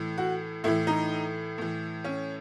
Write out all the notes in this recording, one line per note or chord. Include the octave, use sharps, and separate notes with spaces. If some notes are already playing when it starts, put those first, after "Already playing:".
Already playing: A2 E3
F#4
A2 E3 E4
D#4
A2 E3
C#4